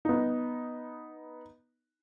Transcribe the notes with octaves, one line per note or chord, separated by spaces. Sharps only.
B3 D#4